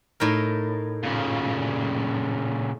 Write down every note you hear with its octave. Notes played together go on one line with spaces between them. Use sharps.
A2 D#4 A#4
A#2 C#3